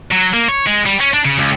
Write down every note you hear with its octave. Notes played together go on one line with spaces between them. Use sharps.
F#3
A#3
C#5
G#3
G3
C#4
D4
C#3
C#2